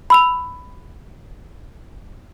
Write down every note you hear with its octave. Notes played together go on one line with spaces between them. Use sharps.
B5 E6 F7